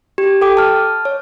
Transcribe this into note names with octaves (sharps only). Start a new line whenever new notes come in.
G4
A4 G5 D6
A5 F6
C#5